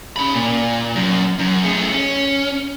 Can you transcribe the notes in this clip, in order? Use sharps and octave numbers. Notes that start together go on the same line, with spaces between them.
C#4 B5
A#2
F#2
F#2
A3 G#4
C#4